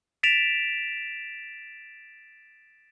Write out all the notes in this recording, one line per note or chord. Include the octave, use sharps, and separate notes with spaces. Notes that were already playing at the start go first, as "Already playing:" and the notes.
A6 B6 D7 E7 F7